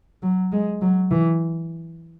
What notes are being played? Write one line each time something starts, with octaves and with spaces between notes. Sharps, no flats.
F#3
G#3
F#3
E3